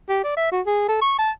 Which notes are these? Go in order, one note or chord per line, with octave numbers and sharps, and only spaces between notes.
G4
D5
E5
F#4
G#4
A4
C#6
A5